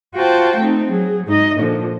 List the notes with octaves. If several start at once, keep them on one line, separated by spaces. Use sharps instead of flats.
F4 F#4 C5 G5 A5
A3 C4 D#4
F#3 G#4
G#2 D#4 D#5
A#2 D3 F3